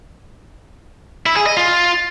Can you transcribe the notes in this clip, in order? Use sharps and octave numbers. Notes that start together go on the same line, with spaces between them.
E4
G#4
D#5
F4